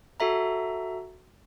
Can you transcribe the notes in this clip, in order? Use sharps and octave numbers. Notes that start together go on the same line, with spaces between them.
F#4 A4 E5 A#5